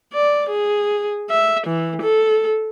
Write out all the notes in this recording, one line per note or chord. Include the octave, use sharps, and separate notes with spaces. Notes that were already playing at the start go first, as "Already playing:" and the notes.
D5
G#4
E5
E3
A4